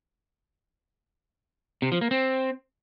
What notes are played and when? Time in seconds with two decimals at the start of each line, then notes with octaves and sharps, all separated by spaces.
1.82 C3
1.92 F3
2.01 A#3
2.11 C4